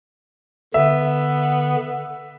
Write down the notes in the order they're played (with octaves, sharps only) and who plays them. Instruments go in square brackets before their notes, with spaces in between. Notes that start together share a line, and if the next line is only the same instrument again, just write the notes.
[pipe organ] D3 [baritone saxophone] B3 [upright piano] E5